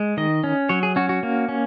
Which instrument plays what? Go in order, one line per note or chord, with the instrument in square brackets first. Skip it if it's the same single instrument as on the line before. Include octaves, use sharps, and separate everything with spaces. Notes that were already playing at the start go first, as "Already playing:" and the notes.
Already playing: [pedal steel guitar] G#3
D#3 D#5
C#4
F#3 C#5
G#4
C#4 F#4
F#4
A#3
C#4